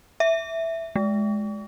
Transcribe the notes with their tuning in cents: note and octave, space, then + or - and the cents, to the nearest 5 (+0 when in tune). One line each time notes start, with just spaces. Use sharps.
E5 +0
G#3 +15